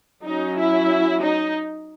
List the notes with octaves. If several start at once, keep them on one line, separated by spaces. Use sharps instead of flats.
F#3 C#4 D#4
E4
D#4